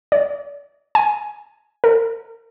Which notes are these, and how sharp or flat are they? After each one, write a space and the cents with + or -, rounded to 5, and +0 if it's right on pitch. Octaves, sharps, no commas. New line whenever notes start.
D5 -40
G#5 +10
A#4 -35